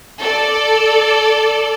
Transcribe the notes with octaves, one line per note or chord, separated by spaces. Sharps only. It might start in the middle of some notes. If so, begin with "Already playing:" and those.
A4 D5